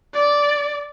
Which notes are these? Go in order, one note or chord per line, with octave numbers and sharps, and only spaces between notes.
D5